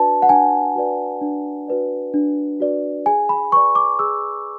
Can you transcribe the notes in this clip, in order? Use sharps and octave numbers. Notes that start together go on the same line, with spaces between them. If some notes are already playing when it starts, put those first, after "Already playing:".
Already playing: D4 F#4 B4 D5 A5
F#5
D4 G#5
F#4 B4 D5
D4
F#4 B4 D5
D4
F#4 B4 D5
G#4 G#5
B5
B4 D5 C#6
D6
G#4 E6